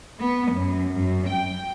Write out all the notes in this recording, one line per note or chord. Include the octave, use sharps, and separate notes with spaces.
B3
F#2
F#2
G5